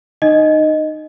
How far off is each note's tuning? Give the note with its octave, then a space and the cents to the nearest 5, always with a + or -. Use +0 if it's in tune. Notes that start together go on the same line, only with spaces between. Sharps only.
D#4 -20 D#5 +0